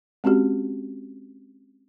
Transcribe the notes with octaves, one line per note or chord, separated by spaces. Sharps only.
G#3 C4 C#4 F#4 G4